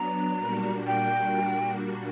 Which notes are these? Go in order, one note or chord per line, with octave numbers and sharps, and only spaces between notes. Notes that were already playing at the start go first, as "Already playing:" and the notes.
Already playing: F#3 B3 D4 A#5
A#2 G3 A#3 D4 F#4
G5